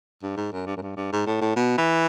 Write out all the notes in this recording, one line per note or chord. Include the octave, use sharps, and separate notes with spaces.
G2
G#2
F#2
G2
F#2
G2
G2
G#2
A2
A2
B2
E3